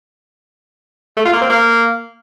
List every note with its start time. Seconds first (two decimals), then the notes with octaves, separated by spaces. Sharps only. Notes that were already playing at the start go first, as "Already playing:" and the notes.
1.17 A3
1.25 F4
1.33 A#3
1.42 C4
1.50 A#3